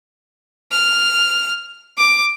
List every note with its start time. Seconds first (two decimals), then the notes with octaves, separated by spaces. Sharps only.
0.72 F6
1.98 D6